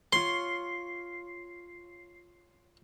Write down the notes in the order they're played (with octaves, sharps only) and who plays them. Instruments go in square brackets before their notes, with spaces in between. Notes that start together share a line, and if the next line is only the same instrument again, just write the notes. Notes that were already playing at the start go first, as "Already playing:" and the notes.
[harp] F4 C#5 [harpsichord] C6 [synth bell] C7